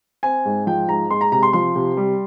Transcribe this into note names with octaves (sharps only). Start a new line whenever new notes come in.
C4 G#5
G#2
F3 G5
G#2 A#5
G#3 C6
A#5
C3 A#5
C6
F3 C6
C3
G3